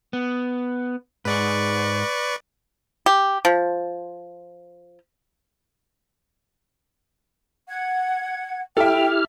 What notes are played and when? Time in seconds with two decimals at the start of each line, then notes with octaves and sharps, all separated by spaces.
0.13 B3
1.25 G#2 G#4 B4 D5 C#6
3.06 G4
3.45 F3
7.68 F#5 G#6
8.77 E4 G4 A4 E5 G5 F6